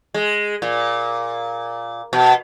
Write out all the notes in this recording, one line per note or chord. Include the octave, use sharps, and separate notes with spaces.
G#3
A#2
B2